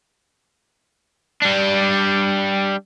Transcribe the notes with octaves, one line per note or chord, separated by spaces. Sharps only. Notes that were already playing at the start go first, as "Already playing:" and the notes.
G3 D4